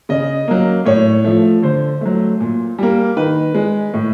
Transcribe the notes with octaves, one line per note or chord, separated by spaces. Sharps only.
C#3 D#5
F#3 A#3
A2 C#5
F3 A3
D3 C5
F#3 A3
A#2
G3 A#3
D#3 B4
G#3
A2